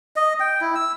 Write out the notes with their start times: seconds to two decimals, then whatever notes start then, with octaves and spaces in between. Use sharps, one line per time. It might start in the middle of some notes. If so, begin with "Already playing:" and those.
0.16 D#5
0.40 G5
0.61 E4
0.75 E6